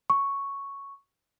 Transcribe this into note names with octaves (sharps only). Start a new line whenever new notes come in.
C#6